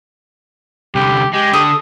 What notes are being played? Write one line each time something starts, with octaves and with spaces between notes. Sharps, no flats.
C2 D3 G4
G#3 G4
D3 A4 D#6